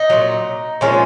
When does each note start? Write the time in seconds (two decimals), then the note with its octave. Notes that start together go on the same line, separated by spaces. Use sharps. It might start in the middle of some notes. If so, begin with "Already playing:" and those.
Already playing: D#4
0.10 A#2 F#3
0.81 A#2 F3 G#3 C#4